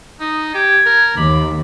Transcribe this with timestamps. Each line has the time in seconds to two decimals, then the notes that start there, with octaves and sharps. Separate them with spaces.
0.20 D#4 D#6
0.54 G4 G#6
0.86 A#4
1.17 D#2 B5 D6